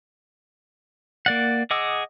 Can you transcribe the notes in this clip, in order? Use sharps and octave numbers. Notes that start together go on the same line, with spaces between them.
A#3 D5 F#5
G#4 D#5 F#5 D6 E6